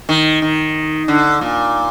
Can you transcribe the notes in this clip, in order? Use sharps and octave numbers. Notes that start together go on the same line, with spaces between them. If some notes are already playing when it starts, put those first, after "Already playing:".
D#3
D#3
D3
A#2